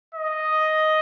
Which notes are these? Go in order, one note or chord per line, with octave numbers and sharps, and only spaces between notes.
D#5